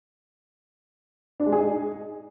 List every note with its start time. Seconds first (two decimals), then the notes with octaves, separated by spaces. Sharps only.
1.40 D4
1.46 G#3
1.52 G#4
1.59 D#4